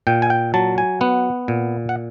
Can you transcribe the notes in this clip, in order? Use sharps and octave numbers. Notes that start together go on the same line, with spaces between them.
A#2 G5
G#5
G5
F#3 A5
G#5
B3 F#5
A#2
F#5